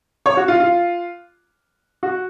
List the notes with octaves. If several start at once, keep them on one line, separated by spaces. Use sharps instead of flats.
C#5
F#4
F4
F4
F#4